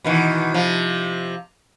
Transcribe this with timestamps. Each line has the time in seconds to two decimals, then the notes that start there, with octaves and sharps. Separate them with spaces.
0.04 B2 D#3 E3
0.54 C3 F3